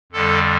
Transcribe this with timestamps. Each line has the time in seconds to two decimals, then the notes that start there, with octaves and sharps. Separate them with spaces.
0.12 F2 D3 G3 A4